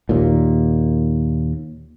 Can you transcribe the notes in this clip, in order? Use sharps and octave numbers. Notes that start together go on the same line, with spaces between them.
D#2 A#2